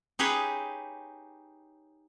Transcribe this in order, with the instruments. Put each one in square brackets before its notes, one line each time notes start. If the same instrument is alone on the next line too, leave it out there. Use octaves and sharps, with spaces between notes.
[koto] D#4 G4 G#4 B4 C#5